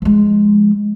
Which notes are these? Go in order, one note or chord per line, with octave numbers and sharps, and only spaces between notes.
F3 G#3